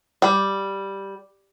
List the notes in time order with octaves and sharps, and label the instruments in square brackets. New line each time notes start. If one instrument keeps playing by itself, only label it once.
[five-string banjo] G3